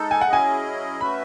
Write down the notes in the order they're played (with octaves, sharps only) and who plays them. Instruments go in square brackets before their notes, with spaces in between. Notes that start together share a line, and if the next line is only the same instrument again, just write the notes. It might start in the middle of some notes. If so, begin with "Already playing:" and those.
Already playing: [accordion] G#3 D#4 A4
[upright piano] G#5
F#5
[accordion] F#3 C#4 E4 G#4 D#5 [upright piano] G#5
[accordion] A3 C#4 F#4 B4 E5 [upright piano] B5